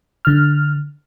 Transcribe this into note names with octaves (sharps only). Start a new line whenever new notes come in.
D3 F6